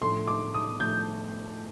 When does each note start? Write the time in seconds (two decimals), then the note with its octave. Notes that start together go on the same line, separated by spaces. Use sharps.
0.01 A2 F3 A3 D4 A4 C6
0.27 D6
0.54 D#6
0.80 A2 F3 A3 D4 A4 G6